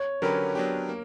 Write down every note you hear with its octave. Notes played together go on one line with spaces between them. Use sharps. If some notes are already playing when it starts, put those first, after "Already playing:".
Already playing: C#5
D3 F#3 C#4 G4 A#4 B4
F#3 B3 D4 G4
A#3